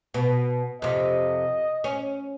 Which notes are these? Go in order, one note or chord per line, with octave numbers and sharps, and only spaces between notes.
B2
F2 C3 D#5
C#4